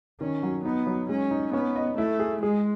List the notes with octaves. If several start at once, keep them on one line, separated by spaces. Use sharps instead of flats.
D#3 C#4
F#3
B3 D#4
F#3
G#3 C#4
D#4
B3 C#4
D#5
A3 E4
G#4
G#3 G#4